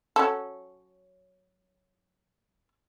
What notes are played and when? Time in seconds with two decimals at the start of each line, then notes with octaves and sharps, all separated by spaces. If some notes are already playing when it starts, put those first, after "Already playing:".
0.16 F#3 C#4 A4